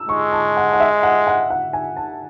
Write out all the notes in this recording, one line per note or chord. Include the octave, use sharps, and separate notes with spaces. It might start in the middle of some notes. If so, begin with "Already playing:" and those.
Already playing: E6
G#3 C#6
A5
F#5
F#5
E5
F#5
F#5
F#5
G#5
A5